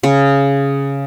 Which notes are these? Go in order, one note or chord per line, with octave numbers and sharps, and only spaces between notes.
C#3